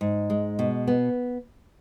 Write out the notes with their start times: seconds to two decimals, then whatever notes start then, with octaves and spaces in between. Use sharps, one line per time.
0.01 G#2
0.30 G#3
0.59 B2
0.87 B3